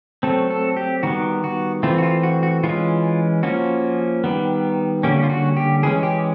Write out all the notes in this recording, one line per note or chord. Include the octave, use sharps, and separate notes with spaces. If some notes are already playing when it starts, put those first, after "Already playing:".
F#3 A3 C4 A4
A4
G4
D#3 G3 B3 F#4
F#4
E3 A3 C4 F4
F#4
F4
F#4
F#4
E3 G#3 C#4 F4
F3 A#3 C#4 F#4
D#3 G3 B3
D3 G3 A#3 C#4 G4
F4
F#4
G4
E3 G#3 C#4 G#4
G4